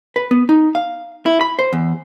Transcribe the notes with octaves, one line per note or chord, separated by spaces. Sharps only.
B4
B3
D#4
F5
E4
B5
C5
E2